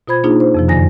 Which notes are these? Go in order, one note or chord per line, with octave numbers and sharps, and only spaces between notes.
B2 F4 C5 B5 G#6
A#3 D4 D#4 F4 G#4
C5
F2 C3 F3
F#2 B2 D3 D#3 G#5 A#6